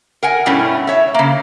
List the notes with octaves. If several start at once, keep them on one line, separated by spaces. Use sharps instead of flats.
A#4 F#5 G#5
G2 B2 G3 A3 C#4 E4
C#5 E5
C#3 A#3